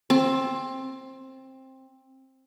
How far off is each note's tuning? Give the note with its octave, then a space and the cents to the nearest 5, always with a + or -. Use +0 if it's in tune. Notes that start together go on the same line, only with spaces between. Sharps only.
C4 +15